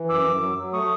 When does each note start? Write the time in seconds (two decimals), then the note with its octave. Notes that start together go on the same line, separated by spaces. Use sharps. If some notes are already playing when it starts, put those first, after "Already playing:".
Already playing: E3
0.09 F#2 D6 E6
0.24 F#2
0.41 F#3
0.57 F#3
0.73 A3 C#6 D#6